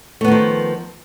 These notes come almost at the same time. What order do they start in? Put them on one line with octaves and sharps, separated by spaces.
A3 B3 D#3 F3